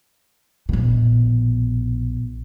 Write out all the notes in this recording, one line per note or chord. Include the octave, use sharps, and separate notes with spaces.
A#1 B2